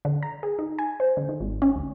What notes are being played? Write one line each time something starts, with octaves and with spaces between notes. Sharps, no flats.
D3
A#5
G#4
D#4
G#5
C5
D3
D#3
G#1
C#4
D2